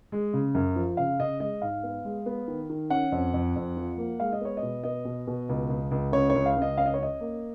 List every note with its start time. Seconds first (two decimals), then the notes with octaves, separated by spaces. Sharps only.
0.12 G#3
0.33 C#3
0.55 F#2
0.76 F3
0.97 C#3 F5
1.19 C#3 D#5
1.40 G#3 D#5
1.62 G#2 F5
1.83 B3
2.05 G#3
2.26 B3
2.48 D#3
2.70 D#3
2.90 C#4 F#5
3.12 F2
3.34 F2
3.56 F2
3.77 F3
3.98 A#3
4.20 G#3 F5
4.33 D#5
4.41 B3 C#5
4.57 D#5
4.63 B2
4.84 B3 D#5
5.05 B2
5.27 B2
5.49 C#2
5.69 C#2
5.91 C#2
6.12 C#3 C#5
6.30 C#5
6.35 C#2
6.46 F5
6.56 C#2
6.62 D#5
6.78 C#4 F5
6.86 D#5
6.94 C#5
6.99 C#4 D#5
7.21 A#3